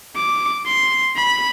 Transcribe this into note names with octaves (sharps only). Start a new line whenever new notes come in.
D6
C6
B5